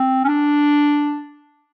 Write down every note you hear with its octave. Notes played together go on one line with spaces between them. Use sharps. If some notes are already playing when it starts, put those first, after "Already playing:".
Already playing: C4
C#4
D4